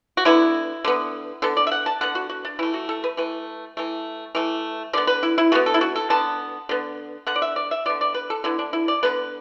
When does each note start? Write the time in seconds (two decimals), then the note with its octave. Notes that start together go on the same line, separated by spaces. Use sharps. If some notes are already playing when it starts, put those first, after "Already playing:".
0.17 F#4
0.25 D3 B3 E4
0.85 D3 B3
1.42 D3 B3 A4
1.57 D5
1.67 E5
1.72 F#5
1.86 A5
2.01 D3 B3 F#5
2.15 F#4
2.30 F#4
2.45 D4
2.59 E3 A3 E4
2.74 F#4
2.89 A4
3.04 B4
3.17 E3 A3 B4
3.77 E3 A3
4.35 E3 A3
4.93 D3 B3 D5
5.07 B4
5.23 E4
5.38 E4
5.52 D3 B3 F#4
5.66 A4
5.74 E4
5.81 F#4
5.96 A4
6.10 D3 B3 A5
6.69 D3 B3
7.27 D3 B3 F#5
7.36 D5
7.42 E5
7.56 D5
7.71 E5
7.86 D3 B3 D5
8.01 D5
8.14 B4
8.30 A4
8.44 D3 B3 E4
8.59 D4
8.73 E4
8.88 D5
9.03 D3 B3 B4